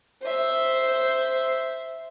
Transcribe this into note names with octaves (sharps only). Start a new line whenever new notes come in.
C5 E5